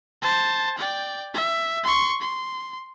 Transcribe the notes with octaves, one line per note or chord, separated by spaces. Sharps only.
C5 A5
D5 G5
E5
C6 C#6
C6